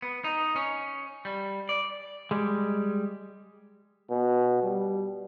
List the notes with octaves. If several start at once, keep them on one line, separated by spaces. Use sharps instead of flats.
B3
D#4
C#4
G3
D5
G3 G#3
B2
G3